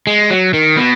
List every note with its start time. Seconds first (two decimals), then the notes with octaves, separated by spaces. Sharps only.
0.07 G#3
0.30 F#3
0.54 D#3
0.77 B2